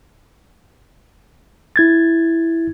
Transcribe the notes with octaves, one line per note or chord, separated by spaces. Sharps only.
E4 G#6 A6